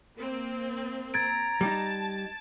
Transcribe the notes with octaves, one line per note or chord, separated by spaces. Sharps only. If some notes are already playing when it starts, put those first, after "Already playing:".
A#3 C4
A#5 G#6 A6 D7
G3 D#4 A5